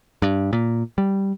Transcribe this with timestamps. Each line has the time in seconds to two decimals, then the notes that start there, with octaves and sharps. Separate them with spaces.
0.22 G2
0.53 A#2
0.98 G3